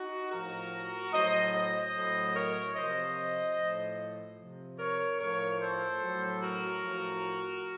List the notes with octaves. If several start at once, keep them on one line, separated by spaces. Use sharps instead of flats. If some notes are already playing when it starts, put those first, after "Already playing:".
Already playing: D#4 F#4
A2 F3 F#4 A#4
A2 F#3 C5 D#5
C5 D#5
A2 F#3
A#4 C#5
C3 F3 C5 D#5
A2 F3
C3 F3
A#4 C#5
A2 F3 A#4 C#5
A4 C5
A2 F#3
F#4 A#4
A2 F3